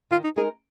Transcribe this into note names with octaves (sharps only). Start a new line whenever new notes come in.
D#3 F4
D#4
G#3 D#4 G#4 A#4